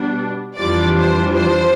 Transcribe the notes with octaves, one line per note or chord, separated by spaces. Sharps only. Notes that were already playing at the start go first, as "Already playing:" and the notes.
Already playing: B2 G3 D4
F2 E3 G3 D4 F4 D5
C5
C5